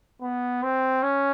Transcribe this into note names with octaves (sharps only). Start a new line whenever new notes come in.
B3
C4
C#4